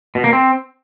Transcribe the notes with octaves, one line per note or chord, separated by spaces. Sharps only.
B2
A#3
C4